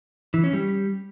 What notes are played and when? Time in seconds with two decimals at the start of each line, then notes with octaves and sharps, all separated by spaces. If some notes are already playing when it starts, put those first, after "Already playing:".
0.34 E3
0.44 C#4
0.53 G3